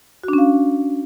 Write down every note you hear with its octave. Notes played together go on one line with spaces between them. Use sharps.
C#4 D4 F#4 F5